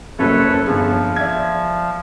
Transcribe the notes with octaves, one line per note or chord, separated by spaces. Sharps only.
F#1 F#2 A4 B4 C#5
G1 F3 G#4
D5 E5 G#6